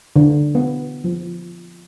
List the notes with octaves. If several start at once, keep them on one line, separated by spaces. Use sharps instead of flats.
D3
B3
F3